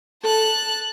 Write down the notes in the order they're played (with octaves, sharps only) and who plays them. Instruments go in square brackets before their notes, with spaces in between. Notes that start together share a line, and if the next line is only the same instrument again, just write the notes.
[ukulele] A4 [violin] A5 F#6